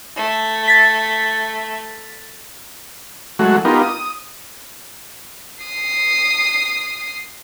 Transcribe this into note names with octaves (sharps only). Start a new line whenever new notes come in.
A3
A6 B6
F#3 G#3 A3 F#4
B3 D#4 F4 G4 A#4
D#6
D#6 C7